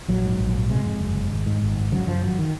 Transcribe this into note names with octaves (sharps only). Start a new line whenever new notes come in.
A#1 F#3
G#2
A#1
G#2
C3 G#3
F2
F#1
F#1
G#1
G#2
G#1
G#2
C#3 F#3
F#2 F3
G#1 F#3
D#3